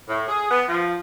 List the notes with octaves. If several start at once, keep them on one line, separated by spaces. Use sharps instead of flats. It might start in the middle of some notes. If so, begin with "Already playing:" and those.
A2
G#4
B3
F3